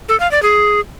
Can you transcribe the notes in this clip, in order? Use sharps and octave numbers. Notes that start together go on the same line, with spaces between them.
A4
F5
D5
G#4